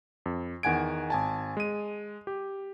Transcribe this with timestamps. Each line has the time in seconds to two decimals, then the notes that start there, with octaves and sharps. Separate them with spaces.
0.26 F2
0.63 E2 D#3 F#5 G#5 G#6 D7
1.10 G#1 G#5 A5
1.57 G#3 D#7
2.27 G4